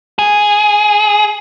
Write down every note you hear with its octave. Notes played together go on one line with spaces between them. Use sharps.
G#4